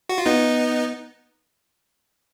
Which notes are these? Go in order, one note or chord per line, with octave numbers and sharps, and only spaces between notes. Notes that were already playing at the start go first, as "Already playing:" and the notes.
F#4
F4
B3 D#4